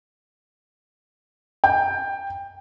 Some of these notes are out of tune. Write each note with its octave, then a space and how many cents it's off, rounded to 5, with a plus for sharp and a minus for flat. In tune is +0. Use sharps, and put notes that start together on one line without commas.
G5 +15